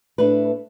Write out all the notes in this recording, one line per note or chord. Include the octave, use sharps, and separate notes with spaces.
A2 A3 D4 B4